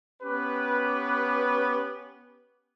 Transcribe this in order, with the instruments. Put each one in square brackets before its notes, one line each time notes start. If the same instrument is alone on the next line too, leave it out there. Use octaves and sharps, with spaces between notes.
[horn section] B3 C#4 G4 B4